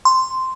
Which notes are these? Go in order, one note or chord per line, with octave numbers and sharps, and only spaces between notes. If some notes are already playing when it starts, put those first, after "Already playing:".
C6